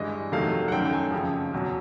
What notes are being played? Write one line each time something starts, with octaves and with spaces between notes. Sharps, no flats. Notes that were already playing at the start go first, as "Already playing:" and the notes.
Already playing: G2 E3 G#3 D#5
F2 C3 D#3 F#3 A3 F5
F#5
F#2 D#3 F#3 A3 G5
G5
G#5
F2 C#3 F3
E2 B2 F#3